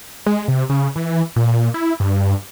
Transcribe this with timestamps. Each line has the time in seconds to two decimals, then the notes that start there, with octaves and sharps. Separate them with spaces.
0.26 G#3
0.48 C3
0.70 C#3
0.96 E3
1.36 A#2
1.74 E4
2.00 G2